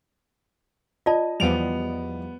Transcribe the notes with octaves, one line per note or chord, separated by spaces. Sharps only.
F4 D5 D#5 A5
E2 F3 G3 B3 D7 F7